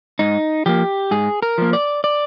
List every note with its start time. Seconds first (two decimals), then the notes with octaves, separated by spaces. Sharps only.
0.19 G#2 D#4
0.66 F3 A#3 G4
1.11 G#2 G#4
1.42 A#4
1.58 F3 A#3
1.73 D5
2.04 D5